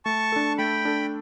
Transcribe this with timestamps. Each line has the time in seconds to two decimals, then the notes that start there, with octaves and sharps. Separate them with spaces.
0.05 A3 A5 C#6
0.32 D4 A4
0.58 A3 G5 B5
0.85 D4 A4